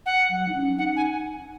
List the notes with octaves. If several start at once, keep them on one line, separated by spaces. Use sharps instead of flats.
F#5
F#3
D#4
C#4
D#4 F#5
G#5